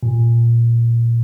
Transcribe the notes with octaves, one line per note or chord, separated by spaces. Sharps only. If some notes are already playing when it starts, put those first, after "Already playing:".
A#2